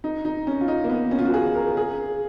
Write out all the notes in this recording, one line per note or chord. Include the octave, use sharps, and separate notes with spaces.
D#4
D#4
C#4
F4
D#4
A#3
B3
C#4
F4
F#4
G#4
A#4
G#4